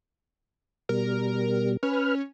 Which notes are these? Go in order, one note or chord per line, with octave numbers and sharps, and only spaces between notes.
B2 G3 A#4
C#4 B4 F6